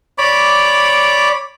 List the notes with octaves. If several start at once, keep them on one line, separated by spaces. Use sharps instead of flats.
C#5 D5 B5 D6